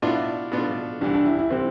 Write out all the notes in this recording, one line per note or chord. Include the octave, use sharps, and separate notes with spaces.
B2 B3 D4 E4 F4
B2 B3 D4 F4
C2 C3 E3 D4
D4
E4
E4
C3 E3 C4